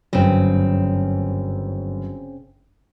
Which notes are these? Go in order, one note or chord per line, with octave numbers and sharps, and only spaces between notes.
G1 F#2 C#3 C4